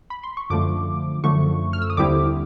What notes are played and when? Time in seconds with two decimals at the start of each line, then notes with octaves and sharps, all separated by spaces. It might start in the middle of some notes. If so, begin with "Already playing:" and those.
0.10 B5
0.23 C6
0.37 C#6
0.50 F#2 D3 F3 A3 D6
1.24 F#2 D3 F3 A3 C#6
1.73 F6
1.82 E6
1.90 D#6
1.97 D#2 D3 G3 C4 E4 D6